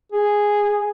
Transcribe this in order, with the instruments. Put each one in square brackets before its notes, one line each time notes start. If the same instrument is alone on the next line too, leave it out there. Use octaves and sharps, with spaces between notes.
[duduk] G#4